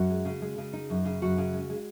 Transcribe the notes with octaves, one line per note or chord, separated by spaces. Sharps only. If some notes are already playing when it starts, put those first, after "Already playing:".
Already playing: F#2 F#4
G#3
C#3
G#3
C#3
D#4
F#2
C#3
F#2 F#4
C#3
G#3
G#3